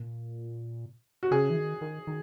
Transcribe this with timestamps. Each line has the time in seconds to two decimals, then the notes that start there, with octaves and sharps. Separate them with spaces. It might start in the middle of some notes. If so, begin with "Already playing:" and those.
Already playing: A#2
1.23 F#4
1.31 C#3 G#4
1.50 E3
1.56 D#3
1.81 D#3
2.07 D#3